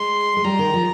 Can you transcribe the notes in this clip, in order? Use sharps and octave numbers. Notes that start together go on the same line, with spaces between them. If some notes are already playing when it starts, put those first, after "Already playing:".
Already playing: G#3 C6
G#3
G3 A#5
D#3
F3